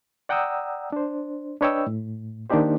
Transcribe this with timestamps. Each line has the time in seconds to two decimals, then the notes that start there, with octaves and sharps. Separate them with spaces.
0.29 D5 F#5 G5 A#5 D#6 E6
0.92 D4 C5
1.61 D4 B4 C#5 D#5 G5 E6
1.87 A2
2.50 D#3 A#3 D4 D#4 G4 C5